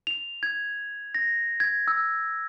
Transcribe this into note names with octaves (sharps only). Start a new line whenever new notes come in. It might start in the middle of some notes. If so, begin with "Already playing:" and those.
F7
G#6
A#6
G#6
E6